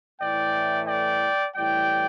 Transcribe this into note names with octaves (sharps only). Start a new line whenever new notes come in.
A2 E3 A3 D5 G5
D5 G5
A2 E3 G3 D5 G5